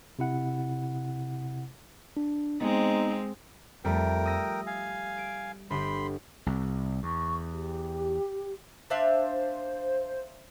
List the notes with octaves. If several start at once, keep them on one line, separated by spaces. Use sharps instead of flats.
C3 E4 F#5
D4
G#3 B3 C4 D#4
F2 G3 A3 A#4 G5
D#6 E6 A#6
F5 G#5
D7
G1 G4 B5 C6
C2
E2 C#6
G4
D4 C5 E5 F5